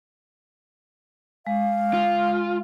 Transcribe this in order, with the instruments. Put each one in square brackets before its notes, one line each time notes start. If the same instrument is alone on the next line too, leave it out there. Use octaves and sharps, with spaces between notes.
[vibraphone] G#3 [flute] F5
[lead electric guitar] F4